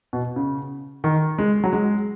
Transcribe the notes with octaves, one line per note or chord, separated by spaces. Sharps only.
B2
C#3
D#3
G#3
F#3
G#3